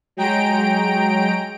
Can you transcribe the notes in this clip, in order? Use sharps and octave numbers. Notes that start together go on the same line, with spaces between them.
F#3 G#3 G5 A#5 D7